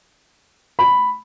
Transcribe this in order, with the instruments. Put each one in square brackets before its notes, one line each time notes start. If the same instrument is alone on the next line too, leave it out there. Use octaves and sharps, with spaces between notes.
[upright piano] B5